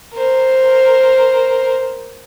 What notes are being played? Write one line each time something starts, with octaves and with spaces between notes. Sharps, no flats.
A#4 C5